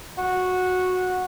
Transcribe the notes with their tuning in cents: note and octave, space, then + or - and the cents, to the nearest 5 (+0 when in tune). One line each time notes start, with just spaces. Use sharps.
F#4 -10